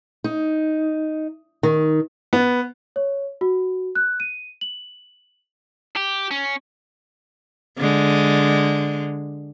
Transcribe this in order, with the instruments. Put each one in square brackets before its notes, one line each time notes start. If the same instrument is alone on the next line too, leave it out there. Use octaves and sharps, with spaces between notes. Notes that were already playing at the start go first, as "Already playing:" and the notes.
[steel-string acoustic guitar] D#4
D#3
[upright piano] B3
[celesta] C#5
F#4
F#6
D#7
F#7
[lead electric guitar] G4
C#4
[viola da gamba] D3 G#3